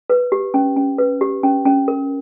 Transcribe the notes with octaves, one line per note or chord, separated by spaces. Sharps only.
B4
G4
C#4
C#4
B4
G4
C#4
C#4
A#4